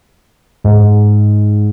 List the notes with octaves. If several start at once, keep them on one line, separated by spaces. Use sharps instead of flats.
G#2